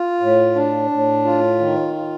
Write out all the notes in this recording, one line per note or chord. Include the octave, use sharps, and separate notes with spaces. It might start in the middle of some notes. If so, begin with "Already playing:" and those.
Already playing: F4
A2
D4
A2
F4
D#3
F4